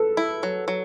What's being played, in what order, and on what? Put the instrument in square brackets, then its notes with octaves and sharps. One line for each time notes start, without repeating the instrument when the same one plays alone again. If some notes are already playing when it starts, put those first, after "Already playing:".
Already playing: [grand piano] A4 B4
[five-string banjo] E4
F#3
F#3